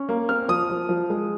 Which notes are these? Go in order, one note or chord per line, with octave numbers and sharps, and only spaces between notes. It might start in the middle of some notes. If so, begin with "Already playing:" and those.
Already playing: C#4
A#3
C4 F6
F3 D#6
F3
F3
G#3